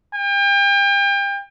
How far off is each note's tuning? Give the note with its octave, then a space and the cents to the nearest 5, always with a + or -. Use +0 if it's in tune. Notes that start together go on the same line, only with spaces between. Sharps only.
G5 +35